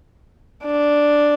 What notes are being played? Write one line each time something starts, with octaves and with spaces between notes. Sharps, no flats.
D4